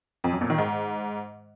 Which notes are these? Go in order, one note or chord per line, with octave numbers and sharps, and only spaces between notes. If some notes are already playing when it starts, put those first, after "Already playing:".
F2
F#2
A#2
D#3
G#2